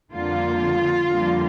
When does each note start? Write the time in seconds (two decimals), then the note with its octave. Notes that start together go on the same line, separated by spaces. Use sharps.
0.13 F2 D3 G3 A#3 F4
1.07 F2 D3 G3 A#3